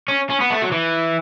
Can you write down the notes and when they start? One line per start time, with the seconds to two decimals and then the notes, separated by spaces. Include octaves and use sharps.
0.08 C#4
0.30 C#4
0.40 B3
0.50 A3
0.62 F#3
0.72 E3